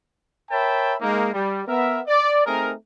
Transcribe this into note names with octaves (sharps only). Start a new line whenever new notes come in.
A#4 C#5 E5 G5 A5 B5
G#3 A#3 D#4
G3
B3 A#4 E5
D5
A3 C4 D#4 G#4 A#4